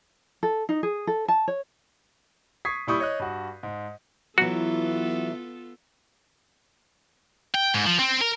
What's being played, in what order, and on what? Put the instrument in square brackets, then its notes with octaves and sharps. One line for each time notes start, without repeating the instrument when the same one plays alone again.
[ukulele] A4
D#4
G#4
A4
A5
C#5
[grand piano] C#6 D#6 G#6 B6 C7
A#2 G3 E4 C#6 D#6 G6
C#5 D#5 F#6
G2 F#4
G#2
[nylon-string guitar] E3 F#3 [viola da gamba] B3 F4 A4 [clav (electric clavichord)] F#4
[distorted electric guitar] G5
G#2
F3
C4
A#4